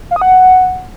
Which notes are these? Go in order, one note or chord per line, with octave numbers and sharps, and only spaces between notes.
F5
D#6
F#5